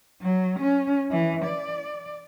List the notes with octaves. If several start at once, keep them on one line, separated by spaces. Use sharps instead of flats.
F#3
C#4
E3
D5